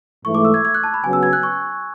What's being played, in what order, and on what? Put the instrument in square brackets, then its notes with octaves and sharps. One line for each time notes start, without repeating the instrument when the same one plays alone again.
[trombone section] G#2 E3 A3 [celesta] C#6
[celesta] D6
E6
G#6
G#6
F#6
A5
B5
[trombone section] C#3 F#3 B3 [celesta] G#5
[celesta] E6
G#6
F#6
C#6